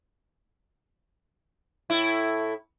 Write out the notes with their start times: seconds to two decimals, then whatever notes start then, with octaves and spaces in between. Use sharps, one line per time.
1.90 A2 E4